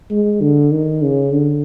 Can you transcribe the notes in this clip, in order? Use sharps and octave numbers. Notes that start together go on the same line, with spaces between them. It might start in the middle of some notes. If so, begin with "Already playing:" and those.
G#3
D3
D#3
C#3
D3